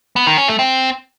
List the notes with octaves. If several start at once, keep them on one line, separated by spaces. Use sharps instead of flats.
B3
D#3
C#4
A3
C4